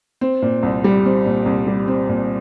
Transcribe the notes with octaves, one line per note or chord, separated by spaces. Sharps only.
C4
A#2
C2
G3
C4
A#2
C2
G3
C4
A#2